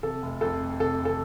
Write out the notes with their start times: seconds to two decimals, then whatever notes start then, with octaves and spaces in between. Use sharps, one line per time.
0.03 C3 A4
0.23 F1
0.41 F2 A4
0.61 F1
0.80 C3 A4
0.99 F1
1.05 A4